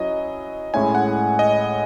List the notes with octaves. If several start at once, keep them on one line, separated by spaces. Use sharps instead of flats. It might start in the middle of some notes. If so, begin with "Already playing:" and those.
Already playing: F#3 C#4 E4 D#5
A2 G#3 C#4 E4 G#5
F#5
D#5